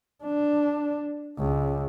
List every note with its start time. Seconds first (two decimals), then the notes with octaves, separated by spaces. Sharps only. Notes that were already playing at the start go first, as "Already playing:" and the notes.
0.24 D4
1.38 C#2